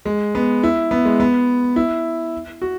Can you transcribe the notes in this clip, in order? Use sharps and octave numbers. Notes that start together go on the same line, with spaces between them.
G#3
B3
E4
B3
G#3
B3
E4
F#4